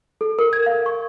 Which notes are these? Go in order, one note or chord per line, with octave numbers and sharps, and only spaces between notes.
A4
A#4
G#6
F5
C#6